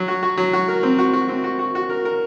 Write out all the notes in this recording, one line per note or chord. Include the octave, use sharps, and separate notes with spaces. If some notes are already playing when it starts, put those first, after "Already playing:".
Already playing: F#3
F#4
F#4
F#3
F#4
A#4
C4
F#4
F#4
C4
F#4
F#4
F#4
A#4
A#4